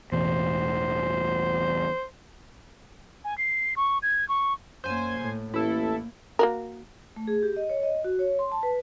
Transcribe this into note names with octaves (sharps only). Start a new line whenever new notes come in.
A1 E2 B2 C5
G#5
C7
C#6
G#6
C#6
F#2 A#3 C5 G#5
A2
A1 A#3 E4 A4
A#3 F#4 A#4
A3
G#4
G4
D#5
C#5
D#5
F#4
C#5
C6
A5
B4